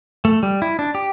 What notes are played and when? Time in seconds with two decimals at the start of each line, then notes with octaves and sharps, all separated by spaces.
0.25 A3
0.43 G3
0.62 E4
0.79 D4
0.95 G4